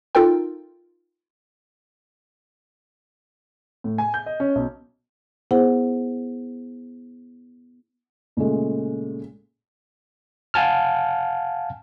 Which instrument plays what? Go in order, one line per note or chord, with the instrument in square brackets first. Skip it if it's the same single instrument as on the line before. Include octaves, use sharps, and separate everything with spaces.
[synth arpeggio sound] D#4 F4 A4 A#4 G5
[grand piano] A2
G#5
G6
D#5
C#4
B1
[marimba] B3 E4 G#4 C5 F#5
[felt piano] A#2 C#3 G#3 A3
[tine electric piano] F5 F#5 G#5 A5 F6